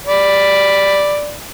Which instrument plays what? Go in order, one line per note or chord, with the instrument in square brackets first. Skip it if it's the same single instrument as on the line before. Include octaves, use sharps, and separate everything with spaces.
[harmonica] D5 B5